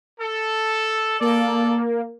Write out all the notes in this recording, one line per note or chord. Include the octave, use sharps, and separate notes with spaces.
A4
A#3 A4 D5